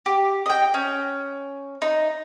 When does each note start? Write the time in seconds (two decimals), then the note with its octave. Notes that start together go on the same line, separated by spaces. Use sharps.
0.06 G4
0.46 D#5 G5
0.74 C#4
1.82 D#4